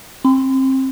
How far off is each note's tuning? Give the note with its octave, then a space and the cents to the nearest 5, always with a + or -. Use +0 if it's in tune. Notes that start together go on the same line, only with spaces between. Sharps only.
C4 +25 C6 -45